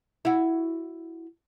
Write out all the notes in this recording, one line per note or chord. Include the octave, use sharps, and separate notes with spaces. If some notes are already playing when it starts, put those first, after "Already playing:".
E4 F#4